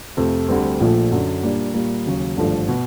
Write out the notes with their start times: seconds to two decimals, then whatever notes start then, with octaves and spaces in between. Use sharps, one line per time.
0.17 F2 C3 F3 A3
0.48 D2 D3 G3 C4
0.80 A#1 A#2 F3 A3
1.11 F#2 D3 F#3
1.43 A#2 G3 A#3 D4
1.74 A#2 G3 A#3
2.06 D#2 C#3 F#3
2.37 G#1 G2 D3 F3 A3
2.68 B2